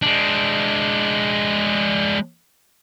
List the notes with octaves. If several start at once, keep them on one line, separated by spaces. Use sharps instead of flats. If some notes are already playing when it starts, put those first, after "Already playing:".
G#3 D4